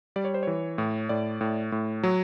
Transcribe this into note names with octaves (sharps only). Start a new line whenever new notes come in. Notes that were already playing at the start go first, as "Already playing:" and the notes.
G3 D5
C#5
C5
E3 C#5
A2
A2 D5
A2
A2
F#3